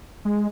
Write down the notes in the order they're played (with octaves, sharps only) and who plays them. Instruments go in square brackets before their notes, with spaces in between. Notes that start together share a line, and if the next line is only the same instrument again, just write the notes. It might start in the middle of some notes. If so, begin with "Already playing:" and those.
[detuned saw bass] G#3